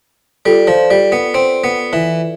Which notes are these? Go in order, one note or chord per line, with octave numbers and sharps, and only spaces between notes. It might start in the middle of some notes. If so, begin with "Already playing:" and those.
G3 F4 A4 D5
F3
G3
B3
C4
B3
E3